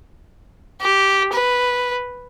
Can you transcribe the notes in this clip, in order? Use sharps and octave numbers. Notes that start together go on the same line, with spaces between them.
G4
B4